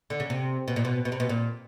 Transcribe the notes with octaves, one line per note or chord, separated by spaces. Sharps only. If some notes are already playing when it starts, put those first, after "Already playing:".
D3
C#3
C3
B2
A#2
B2
B2
C3
B2
A#2